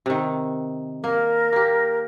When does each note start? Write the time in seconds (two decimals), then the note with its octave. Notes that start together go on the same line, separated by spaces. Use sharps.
0.06 C3 D#3
1.04 A#3 A#4
1.52 A#3 G4